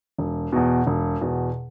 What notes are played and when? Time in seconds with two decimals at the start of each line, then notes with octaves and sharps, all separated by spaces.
0.18 E1
0.53 E2 B2
0.87 E1
1.21 E2 B2